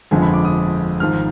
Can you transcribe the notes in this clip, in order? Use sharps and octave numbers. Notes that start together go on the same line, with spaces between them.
G1 F2 D3 F3 G#3 G#5
B5
D6
D#6
G#1 G#2 F3 F6